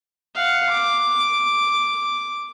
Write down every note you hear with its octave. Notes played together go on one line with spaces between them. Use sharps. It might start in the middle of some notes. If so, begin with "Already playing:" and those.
F5 F#5
D6